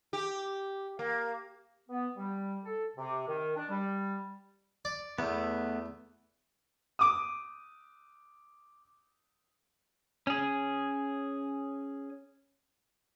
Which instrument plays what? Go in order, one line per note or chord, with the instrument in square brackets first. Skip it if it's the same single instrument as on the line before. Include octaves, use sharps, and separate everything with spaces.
[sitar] G4
A#3
[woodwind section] B3
G3
A4
C3
D#3
D4
G3
[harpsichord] D5
[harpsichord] E2 [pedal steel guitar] A3 B3
[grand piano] D6 D#6
[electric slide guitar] C#4 G#4